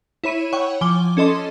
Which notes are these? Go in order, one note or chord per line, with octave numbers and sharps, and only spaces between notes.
E4 C#5 B5 D#7
C#5 F#5 G5 C#6
F3 G#5 D6 G7
C#4 A4 D#5 C6